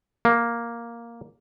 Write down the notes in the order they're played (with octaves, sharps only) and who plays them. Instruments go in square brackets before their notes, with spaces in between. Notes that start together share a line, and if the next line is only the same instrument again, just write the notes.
[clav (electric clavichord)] A#3